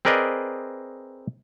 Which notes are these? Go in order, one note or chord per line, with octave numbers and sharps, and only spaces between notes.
C4 G#4 A#4 B4 D5 D#5